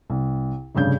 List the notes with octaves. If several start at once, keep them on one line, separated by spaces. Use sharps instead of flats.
C2
F1 G2 C#3 G6